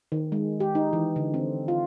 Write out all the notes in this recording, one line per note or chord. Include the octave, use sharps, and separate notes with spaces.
D#3
G#3
G4
D#4
E3
D3
C4
F4